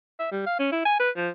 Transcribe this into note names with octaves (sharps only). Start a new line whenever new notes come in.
E5
G3
F5
C#4
E4
G#5
B4
F3